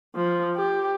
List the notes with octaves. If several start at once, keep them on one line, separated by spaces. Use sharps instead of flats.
F3
G4